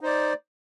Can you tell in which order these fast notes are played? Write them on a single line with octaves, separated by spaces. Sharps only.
D#4 C5 D5